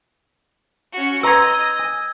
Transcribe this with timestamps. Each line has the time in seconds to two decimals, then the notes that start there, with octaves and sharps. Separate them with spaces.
0.92 C#4 F#4
1.23 B4 D#5 A#5 C6 E6 G#6
1.80 G#5